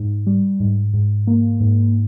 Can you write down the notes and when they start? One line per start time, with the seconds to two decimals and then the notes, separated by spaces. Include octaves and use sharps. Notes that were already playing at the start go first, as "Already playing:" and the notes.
Already playing: G#2
0.27 G3
0.60 G#2
0.94 G#2
1.27 A#3
1.60 G#2